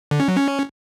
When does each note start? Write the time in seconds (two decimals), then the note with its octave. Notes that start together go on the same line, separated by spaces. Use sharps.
0.11 D3
0.20 C#4
0.28 F#3
0.37 C#4